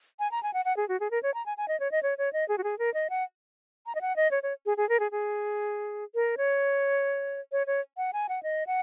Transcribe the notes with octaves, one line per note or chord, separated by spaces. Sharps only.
G#5
A#5
G#5
F#5
F#5
G#4
F#4
G#4
A#4
C#5
A#5
G#5
G#5
D#5
C#5
D#5
C#5
C#5
D#5
G#4
F#4
G#4
A#4
D#5
F#5
A#5
D#5
F#5
D#5
C#5
C#5
G#4
G#4
A#4
G#4
G#4
A#4
C#5
C#5
C#5
F#5
G#5
F#5
D#5
F#5